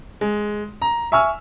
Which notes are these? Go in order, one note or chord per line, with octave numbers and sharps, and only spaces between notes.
G#3
A#5
E5 G#5 C#6 E6 F6